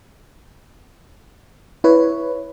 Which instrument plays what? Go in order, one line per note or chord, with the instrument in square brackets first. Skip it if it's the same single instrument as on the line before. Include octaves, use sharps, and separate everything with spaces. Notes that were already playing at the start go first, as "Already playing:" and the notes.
[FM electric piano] E4 B4 C#5